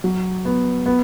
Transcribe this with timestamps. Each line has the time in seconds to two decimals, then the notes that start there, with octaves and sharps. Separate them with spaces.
0.04 F#3
0.45 B3
0.86 B3